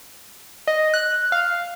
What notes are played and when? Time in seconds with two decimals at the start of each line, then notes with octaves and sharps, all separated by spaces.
0.67 D#5
0.94 F#6
1.32 F5